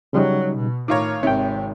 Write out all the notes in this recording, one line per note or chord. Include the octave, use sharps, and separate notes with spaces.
C#3 F#3 G3 D#4
B2
A2 D#3 F4 C#5 A#5 D6
G#1 C3 D#3 C#5 G5